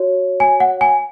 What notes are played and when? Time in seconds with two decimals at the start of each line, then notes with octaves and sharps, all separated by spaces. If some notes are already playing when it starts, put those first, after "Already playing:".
Already playing: F#4 C#5
0.40 G#5
0.60 F#5
0.81 G#5